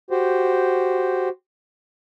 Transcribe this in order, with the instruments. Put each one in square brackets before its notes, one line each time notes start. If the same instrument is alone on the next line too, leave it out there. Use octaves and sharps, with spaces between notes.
[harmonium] F#4 G4 C5